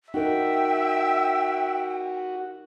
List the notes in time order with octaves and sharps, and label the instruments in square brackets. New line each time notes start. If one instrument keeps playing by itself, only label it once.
[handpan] D#4 A#4 [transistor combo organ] F#4 [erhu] E5 [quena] G5